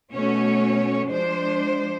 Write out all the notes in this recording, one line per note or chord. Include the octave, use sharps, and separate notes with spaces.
B2 A3 C#4 F#4 C#5
F3 G#3 D4 C5